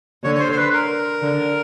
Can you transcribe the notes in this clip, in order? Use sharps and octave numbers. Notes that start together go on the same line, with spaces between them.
D3 C#5
C#5
C5
C5
B4
A#4
D3